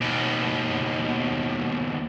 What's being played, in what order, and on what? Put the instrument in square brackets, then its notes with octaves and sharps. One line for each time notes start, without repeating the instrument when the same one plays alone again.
[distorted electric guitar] D#2 B2